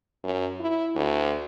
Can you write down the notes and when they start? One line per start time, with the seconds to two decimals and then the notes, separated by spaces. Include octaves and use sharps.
0.24 F#2
0.60 E4
0.95 D2